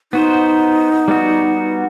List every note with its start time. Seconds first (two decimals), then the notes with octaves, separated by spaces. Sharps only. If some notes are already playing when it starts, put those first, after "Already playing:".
0.13 B3 D#4 F#4 C5
1.08 G3 B3 F#4